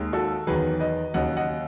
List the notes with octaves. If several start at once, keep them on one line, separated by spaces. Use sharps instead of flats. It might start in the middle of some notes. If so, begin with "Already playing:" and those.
Already playing: D#2 D#3 G#3
F#4 A4
E2 D#3 F#3 G#4 B4
B4 D#5
D#2 C#3 F#3 D#5 F#5
D#5 F#5